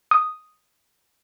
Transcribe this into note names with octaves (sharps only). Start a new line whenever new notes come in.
D#6